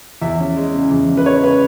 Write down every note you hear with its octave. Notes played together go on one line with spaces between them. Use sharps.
E2 E5
C#4
G#3
C#3
E2
C#4
B4
G#3 C#5
C#3 B4